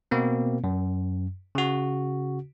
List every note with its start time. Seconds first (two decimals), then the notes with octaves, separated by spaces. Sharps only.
0.11 B2 A#3 C4
0.64 F#2
1.55 C#3 F#4